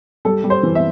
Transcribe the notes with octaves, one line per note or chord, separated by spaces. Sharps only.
G3 A4
G3
C5
E3
E5